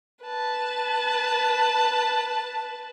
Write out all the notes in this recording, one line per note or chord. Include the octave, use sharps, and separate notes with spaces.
B4 A5